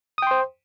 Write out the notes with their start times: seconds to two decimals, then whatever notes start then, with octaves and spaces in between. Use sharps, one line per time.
0.18 D#6
0.22 G5
0.27 C6
0.31 C5